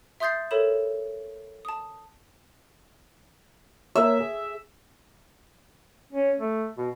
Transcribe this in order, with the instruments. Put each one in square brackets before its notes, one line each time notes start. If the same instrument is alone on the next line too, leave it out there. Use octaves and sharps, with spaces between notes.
[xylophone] E5 C6 D#6 G6 A6 C7
A4 A#4 C#5 E5 B5 E7
A5 D#6
[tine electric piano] A#3 A#4 C#5 [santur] E5
[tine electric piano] G#4
[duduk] C#4
A3
B2